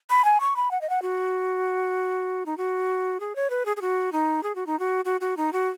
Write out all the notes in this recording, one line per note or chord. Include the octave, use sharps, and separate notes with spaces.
B5
G#5
C#6
B5
F#5
D#5
F#5
F#4
D#4
F#4
G#4
C#5
B4
G#4
G#4
F#4
D#4
G#4
F#4
D#4
F#4
F#4
F#4
D#4
F#4